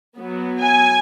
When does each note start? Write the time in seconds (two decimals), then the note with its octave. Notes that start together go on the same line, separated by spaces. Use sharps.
0.18 F#3 B3
0.62 G#5